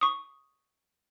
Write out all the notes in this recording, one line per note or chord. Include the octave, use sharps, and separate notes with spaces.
C#6 D#6